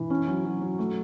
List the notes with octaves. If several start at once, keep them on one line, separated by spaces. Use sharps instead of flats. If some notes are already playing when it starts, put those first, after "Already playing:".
Already playing: E3
C#4
F#3
F#3
F#3
A3